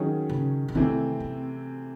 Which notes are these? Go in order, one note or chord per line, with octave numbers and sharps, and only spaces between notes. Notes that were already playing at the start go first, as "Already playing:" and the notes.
Already playing: D#3 F#3 C#4 G#4
C#3
C#3
C3 D#3 E3 A3 C4
C4